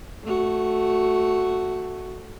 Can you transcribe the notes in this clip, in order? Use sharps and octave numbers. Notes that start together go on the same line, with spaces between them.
A3 F#4